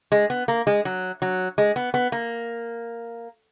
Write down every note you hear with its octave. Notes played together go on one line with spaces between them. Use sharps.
G#3
B3
A#3
G#3
F#3
F#3
G#3
B3
B3
A#3